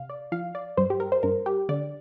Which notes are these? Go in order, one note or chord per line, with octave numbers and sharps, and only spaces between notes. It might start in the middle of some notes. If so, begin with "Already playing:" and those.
Already playing: C3 F5
D5
F3 F5
D5
G2 C5
G4
A#4
C5
G2 A#4
G4
D3 D5